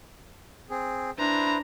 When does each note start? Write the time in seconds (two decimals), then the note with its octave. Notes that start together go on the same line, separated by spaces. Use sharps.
0.70 C4 G#4
1.18 D4 E4 B4 C5 A#5